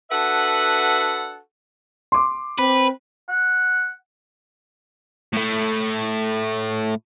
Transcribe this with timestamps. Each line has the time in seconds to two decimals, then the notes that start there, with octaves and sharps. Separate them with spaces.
0.11 D4 F#4 A4 B4 E5 F#5
2.12 C6 D6
2.59 C4 B4
3.29 F#5
5.33 A2 A3